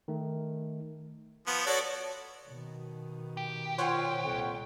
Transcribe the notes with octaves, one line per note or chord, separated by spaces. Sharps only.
D#3 A3
F3 B3
F#4 A4 C#5 D5
B2 D#3
G4
A#2 C5 C#5 F#5
C2 F2 A#2